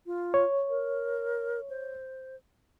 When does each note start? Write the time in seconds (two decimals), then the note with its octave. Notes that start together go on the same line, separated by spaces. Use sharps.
0.06 F4
0.34 C#5
0.69 A#4
1.70 C5